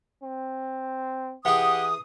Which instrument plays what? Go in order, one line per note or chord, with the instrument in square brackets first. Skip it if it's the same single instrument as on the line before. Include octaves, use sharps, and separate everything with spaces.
[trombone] C4
[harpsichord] E3 G#4 [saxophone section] G4 F#5 [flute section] D#6